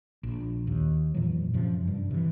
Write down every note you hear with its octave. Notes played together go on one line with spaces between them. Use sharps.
A#1
D#2
F1 A#2 E3 F#3
F#2 C3 F3
G2
C3 E3